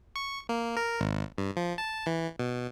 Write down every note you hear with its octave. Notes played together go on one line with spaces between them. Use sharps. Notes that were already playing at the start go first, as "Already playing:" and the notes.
C#6
A#3
A#4
G#1
G2
F3
A5
E3
B2